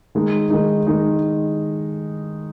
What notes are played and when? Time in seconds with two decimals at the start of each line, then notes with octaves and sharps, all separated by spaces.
0.15 D#3 G#3 D#4
0.50 D#3 G#3 D#4
0.87 D#3 G#3 D#4